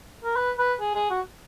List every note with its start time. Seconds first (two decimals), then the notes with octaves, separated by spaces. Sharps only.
0.24 A#4
0.36 B4
0.58 B4
0.81 G#4
0.95 G#4
1.10 F#4